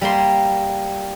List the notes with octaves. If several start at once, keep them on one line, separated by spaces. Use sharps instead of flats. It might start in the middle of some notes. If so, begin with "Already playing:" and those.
G3 A#3 C6